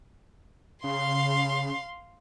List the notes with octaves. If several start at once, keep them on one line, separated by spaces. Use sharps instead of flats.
C#3 F5 C6